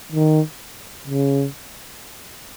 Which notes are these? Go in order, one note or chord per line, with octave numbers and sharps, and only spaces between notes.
D#3
C#3